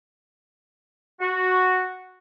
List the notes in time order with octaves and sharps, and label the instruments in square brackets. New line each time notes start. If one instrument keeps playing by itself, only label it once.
[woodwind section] F#4